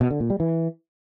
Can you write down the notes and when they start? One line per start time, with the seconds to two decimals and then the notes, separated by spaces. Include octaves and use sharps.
0.01 B2
0.11 D3
0.20 A#2
0.30 G3
0.40 E3